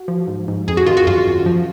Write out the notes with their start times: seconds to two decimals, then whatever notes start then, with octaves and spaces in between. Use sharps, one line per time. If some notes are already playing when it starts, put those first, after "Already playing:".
Already playing: F#4
0.08 F3
0.27 G#2
0.48 G#2
0.68 F2 G#4
0.77 F#4
0.87 D#3 F4
0.97 F#4
1.07 F#2 F4
1.26 F#2
1.46 F3